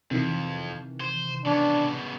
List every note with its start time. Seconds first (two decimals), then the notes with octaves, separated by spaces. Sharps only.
0.11 F2 C3 D#3 E3
1.00 C5
1.46 C#3 B3 D4